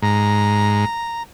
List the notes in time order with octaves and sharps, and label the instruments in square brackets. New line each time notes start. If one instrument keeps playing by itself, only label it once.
[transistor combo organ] G#2 [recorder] A#5